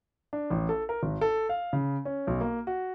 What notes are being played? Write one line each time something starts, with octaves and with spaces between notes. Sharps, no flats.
D4
A1
A4
A#4
G#1
A4
F5
C#3
C#4
B1
A#3
F#4